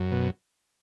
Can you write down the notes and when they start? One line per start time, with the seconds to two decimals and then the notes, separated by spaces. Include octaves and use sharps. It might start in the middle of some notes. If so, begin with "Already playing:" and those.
Already playing: F#2
0.11 B2